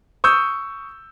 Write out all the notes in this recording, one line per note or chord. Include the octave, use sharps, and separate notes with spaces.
C#6 D#6 E6 G6